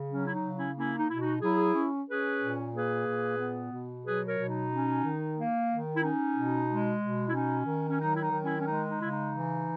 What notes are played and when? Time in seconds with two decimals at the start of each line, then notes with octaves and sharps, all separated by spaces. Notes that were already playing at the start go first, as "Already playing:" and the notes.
Already playing: C#3
0.10 F#3 C#4
0.25 E4
0.32 D#4
0.42 C#3
0.54 C#4 E4
0.75 A#3 C#4 E4
0.97 D#4
1.09 B2 E4
1.19 D#4 F#4
1.41 F#3 E4 G#4
1.74 C#4
2.07 C#4 G#4 B4
2.41 A#2
2.73 A#3 G#4 B4
3.07 A#2
3.39 B3
3.72 B2
4.04 F#3 G#4 B4
4.27 A#4 C#5
4.38 B2
4.48 D#4
4.71 C#4
5.04 D#3
5.37 A#3
5.69 D#3
5.94 E4
6.02 C#4 D#4
6.35 B2
6.68 G#3
7.02 B2
7.26 E4
7.33 C#4 D#4
7.66 D#3
7.88 C#4
7.99 F#3 D#4
8.15 E4
8.21 D#4
8.32 D#3
8.43 C#4 E4
8.58 C#4
8.65 G#3 D#4
8.88 D#4
8.98 C#3 E4
9.09 D#4
9.31 E3